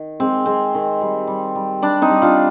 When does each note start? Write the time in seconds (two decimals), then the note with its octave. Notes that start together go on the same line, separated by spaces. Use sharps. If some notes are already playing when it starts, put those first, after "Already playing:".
Already playing: D#3
0.20 G#3 C4
0.46 G#3 C4
0.75 D#3
1.01 G3
1.27 G3
1.55 G3
1.82 G3 D4
2.02 C4 D#4
2.09 G3
2.22 D4 F4